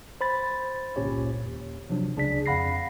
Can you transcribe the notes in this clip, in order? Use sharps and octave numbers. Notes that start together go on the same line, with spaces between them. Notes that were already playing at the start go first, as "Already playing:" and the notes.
C5 B5 A6
G1 C#2 A#2 C#4 G4 C#5
D#2
C3 F3 F#3 D4
C#2 C#3 D4 G#4 D5 B6
F2 F5 F#5 B5 A#6 C7